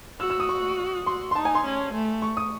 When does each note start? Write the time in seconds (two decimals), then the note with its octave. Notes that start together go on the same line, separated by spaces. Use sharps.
0.20 F#4 E6
0.30 E6
0.40 D#6
0.49 C#6
1.07 F#4 C6
1.31 C6
1.35 D#4 A5
1.45 G#5
1.55 C6
1.65 C#4
1.94 A3
2.22 C#6
2.37 D#6